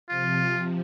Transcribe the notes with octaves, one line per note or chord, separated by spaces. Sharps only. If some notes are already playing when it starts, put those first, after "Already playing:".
C3 F3 F4